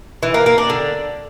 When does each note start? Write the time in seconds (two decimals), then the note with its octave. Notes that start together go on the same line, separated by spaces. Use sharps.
0.23 E3
0.34 A#3
0.46 A#3
0.58 D4
0.70 D3